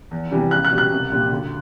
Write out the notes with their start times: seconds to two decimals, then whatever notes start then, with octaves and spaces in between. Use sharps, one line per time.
0.11 E2
0.31 C3 E3 G3
0.51 C#2 F#6
0.65 F#6
0.71 B2 G3
0.78 F#6
0.91 C2
1.11 A#2 G3
1.31 D2